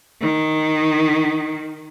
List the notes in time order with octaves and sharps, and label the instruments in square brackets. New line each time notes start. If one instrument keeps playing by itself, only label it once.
[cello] D#3